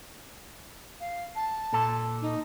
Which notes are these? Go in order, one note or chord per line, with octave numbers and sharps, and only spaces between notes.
F5
A5
A#2 A4
D#4